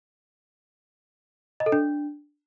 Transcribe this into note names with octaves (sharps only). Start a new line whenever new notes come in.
D#5
A4
D4